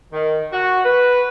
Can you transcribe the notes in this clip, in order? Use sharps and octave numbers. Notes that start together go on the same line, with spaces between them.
D#3
F#4
B4